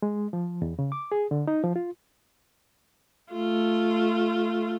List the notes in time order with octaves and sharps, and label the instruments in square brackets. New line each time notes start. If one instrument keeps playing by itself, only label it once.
[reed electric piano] G#3
F3
E2
C#3
D6
G#4
D3
D#4
F3
F4
[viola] A3 F4